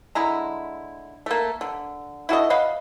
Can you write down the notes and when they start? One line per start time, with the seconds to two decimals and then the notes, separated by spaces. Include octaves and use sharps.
0.15 D3 G#3 E4 A#5
1.26 A3 A#3
1.61 D3
2.29 E4 F#4 A4 D#5
2.50 D#5 F5 F#5 B5